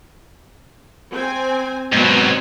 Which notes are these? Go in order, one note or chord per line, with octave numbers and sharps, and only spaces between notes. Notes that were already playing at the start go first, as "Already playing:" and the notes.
C4 G#5
G#2 B2 F#3 B3 C4